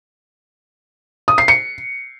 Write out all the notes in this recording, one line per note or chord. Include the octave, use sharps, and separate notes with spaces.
D#6
C7
C#7